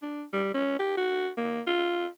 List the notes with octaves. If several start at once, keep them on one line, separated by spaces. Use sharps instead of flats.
D4
G3
C#4
G4
F#4
A#3
F4